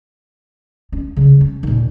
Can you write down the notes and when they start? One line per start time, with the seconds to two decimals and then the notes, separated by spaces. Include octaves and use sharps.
0.92 C#4
1.17 C#3 G3
1.41 C#4
1.63 D#2 A#2